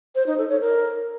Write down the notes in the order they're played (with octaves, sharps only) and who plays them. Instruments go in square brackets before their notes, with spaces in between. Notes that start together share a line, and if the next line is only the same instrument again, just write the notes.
[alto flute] C5
D#4
A4
C#5
A#4